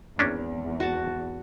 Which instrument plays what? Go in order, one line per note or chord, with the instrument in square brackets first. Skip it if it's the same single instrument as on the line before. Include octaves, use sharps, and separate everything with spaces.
[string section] G#1 E2 [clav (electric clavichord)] A#3 C#4 D4
[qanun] F#4 A5